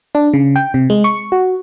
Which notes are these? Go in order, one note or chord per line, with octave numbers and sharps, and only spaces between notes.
D4
C#3
G5
C3
G#3
C#6
F#4